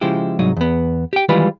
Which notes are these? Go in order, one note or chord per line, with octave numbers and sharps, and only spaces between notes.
C#3 F3 G#3 E4 G4
C2 G#2 F#3 D#4
E2 B3
G4 G5
D#3 E3 G3 G#3 F4 B4